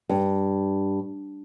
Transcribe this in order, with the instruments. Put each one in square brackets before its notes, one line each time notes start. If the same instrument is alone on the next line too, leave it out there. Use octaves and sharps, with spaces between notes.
[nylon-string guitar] G2